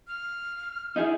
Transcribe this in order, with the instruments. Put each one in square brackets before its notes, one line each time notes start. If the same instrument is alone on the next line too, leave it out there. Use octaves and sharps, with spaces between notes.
[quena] F6
[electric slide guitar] D#4 E4 G#4